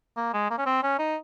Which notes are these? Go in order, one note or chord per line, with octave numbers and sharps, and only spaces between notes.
A#3
G#3
A#3
C#4
C4
C#4
D#4